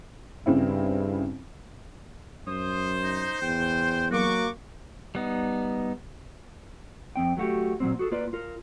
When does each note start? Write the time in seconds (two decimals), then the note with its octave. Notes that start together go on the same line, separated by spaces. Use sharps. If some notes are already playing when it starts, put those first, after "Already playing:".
0.46 G2 C#3 C4 E4
2.47 F#2 C5 D#6
3.04 D#4
3.42 E2 G5
4.11 F#3 A#3 F#4 C#6 D6
5.15 G3 B3 D#4
7.16 F2 C4 G5
7.37 F#3 A3 F#4 G4
7.80 A#2 F#3 A#3 C4
7.99 F#4 G#4 A4
8.11 A#3 F4 B4 D5
8.33 F4 A#4